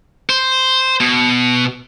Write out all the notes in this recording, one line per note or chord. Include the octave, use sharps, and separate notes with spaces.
C5
B2